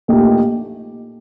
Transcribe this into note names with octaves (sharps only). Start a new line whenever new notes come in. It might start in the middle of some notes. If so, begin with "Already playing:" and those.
A#1 A#2 A3 D#4 G4